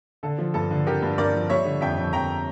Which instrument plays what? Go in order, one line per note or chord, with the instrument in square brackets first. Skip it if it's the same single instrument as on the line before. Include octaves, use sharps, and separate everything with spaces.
[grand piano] D3 [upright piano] A4
[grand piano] F3
[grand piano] G2 [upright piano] A4
[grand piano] D3
[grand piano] D3 [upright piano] G4 A#4
[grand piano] G2
[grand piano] G2 [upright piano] A#4 D5
[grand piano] F3
[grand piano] G3 [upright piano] C#5 E5
[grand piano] D3
[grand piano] F2 [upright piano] E5 G5
[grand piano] F2
[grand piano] F2 [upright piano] G5 A#5